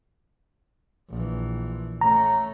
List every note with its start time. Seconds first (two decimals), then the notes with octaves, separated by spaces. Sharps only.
1.09 A#1 E3
2.01 A3 C#4 A#5